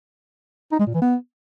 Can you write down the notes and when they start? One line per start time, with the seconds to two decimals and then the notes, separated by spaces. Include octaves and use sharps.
0.72 D#4
0.79 G#3
0.87 A#2
0.94 E3
1.02 B3